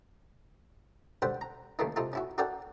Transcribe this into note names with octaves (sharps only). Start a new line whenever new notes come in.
D3 G3 C5 F#5 B5
A#5
D#2 C#3 A3 A#3 D#4
C3 D#4 F4 A4
C#4 E4 F#4
F#4 A4 A#4 D5 F#5 G5